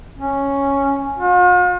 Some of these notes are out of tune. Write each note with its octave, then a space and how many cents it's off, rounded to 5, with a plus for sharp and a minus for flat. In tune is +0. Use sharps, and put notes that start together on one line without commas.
C#4 +0
F4 +45